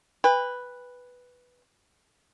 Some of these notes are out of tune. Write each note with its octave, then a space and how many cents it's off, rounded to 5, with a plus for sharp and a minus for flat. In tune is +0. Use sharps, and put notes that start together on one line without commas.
B4 +0 G5 +40